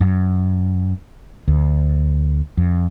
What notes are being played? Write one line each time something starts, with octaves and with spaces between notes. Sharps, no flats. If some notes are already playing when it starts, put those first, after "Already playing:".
F#2
D2
F2